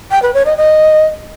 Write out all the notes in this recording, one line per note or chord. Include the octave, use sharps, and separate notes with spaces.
G5
B4
C#5
D#5
D#5